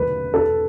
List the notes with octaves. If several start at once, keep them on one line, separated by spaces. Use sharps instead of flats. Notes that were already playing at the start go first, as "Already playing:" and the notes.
Already playing: E2 D3 A3 B4
E2 A4